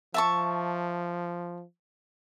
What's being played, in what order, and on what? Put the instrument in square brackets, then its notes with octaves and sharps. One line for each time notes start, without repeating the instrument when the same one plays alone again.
[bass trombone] F3 [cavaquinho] E5 A5 C#6